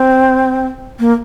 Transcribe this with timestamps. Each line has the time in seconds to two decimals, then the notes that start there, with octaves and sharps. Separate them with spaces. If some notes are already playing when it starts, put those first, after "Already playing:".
Already playing: C4
0.99 A#3